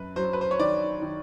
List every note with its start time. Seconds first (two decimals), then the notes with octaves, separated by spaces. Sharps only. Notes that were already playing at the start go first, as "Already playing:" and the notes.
Already playing: F#2 B4
0.16 F#3 C5
0.33 B4
0.41 C5
0.51 C#5
0.59 D#3 D5
1.02 D#3